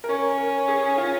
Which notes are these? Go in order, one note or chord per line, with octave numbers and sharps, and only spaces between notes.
A#4
C#4 C#5
A#4
G#4
F4